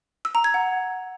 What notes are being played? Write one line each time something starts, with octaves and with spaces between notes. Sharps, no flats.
E6
A#5
G#6
F#5